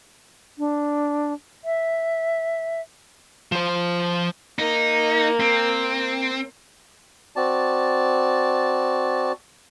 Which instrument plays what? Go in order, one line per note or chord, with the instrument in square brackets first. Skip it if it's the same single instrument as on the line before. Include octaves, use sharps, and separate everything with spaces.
[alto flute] D4
E5
[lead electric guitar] F3 C5
[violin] A#3 [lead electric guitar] D#4
[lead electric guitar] C4
[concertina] C4 F#4 D5 A5